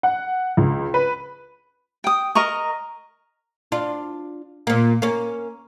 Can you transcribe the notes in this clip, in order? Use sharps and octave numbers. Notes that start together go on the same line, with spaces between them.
F#5
C#2
B4
G5 D#6
A#4 D#5 A#5 C#6
D4 F4
A#2 A#3
A#3 C#4